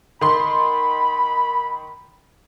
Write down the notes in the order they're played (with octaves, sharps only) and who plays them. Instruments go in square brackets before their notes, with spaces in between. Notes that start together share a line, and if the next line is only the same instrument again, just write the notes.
[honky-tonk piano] D#3 C6 [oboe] B5